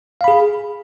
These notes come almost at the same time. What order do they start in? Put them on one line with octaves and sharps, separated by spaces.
F5 B5 G#4